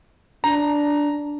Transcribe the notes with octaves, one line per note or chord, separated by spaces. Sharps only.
D4 A#5